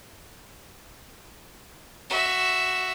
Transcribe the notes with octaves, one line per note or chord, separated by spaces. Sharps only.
F#4 E5